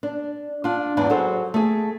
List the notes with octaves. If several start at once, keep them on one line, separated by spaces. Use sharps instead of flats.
D4
D4 F4
E2 G#2 E3 D4
F#3 G#4 A4 C5
A3 G#4